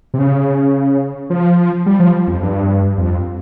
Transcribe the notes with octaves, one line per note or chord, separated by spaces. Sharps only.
C3
C#3
F3
G3
F3
F2
G2
F2